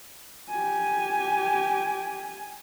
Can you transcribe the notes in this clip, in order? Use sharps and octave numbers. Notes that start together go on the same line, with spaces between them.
G4 G#5